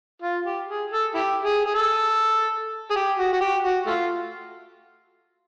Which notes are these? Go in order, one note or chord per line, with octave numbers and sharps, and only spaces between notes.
F4
G4
G#4
A4
E4 G4
G#4
G#4
A4
G#4
G4
F#4
F#4
G4
F#4
A3 F4